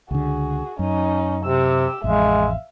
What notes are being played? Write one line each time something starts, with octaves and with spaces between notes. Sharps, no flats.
C#2 D3 F#4 G#4
F#2 C#4 D#4
C3 G4 E6
A1 F2 G#3 E5 F5